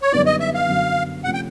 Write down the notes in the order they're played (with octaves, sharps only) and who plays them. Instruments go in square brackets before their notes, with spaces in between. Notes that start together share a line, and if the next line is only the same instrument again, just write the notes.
[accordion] C#5
[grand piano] F#2 D3 G3 B3 D#4 [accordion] D5
[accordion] D#5
E5
F5
[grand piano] F#2 D3 F#3 B3
[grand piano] C3 F3 A3 C#4 [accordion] F#5
[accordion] G5